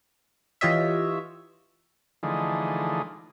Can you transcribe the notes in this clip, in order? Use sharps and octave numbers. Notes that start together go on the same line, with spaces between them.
E3 F4 G4 C#5 D#5 E5
D3 E3 F3 G#3 A3 D#4